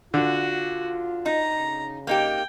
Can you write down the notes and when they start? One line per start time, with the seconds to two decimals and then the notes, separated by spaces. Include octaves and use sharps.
0.14 D3 F4 F#4
1.26 D#4 A#5
1.58 C#3
2.07 A#3 D#4 G4 G5